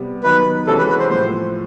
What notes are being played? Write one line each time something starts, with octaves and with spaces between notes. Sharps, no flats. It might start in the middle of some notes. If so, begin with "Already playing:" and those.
Already playing: C3 G3 B3
D#3 F#3 B3 D#4 F#4 B4
C3 E3 G#3 C#4 F#4 A4
B4
B4
C5
A2 F3 A3 C5